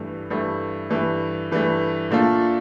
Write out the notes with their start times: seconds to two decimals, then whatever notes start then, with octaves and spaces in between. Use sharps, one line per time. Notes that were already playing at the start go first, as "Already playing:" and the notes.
Already playing: G2 E3 A3
0.30 G2 E3 A3
0.90 G2 E3 A3
1.51 G2 E3 A3
2.11 A#2 A3 D4 F4 A4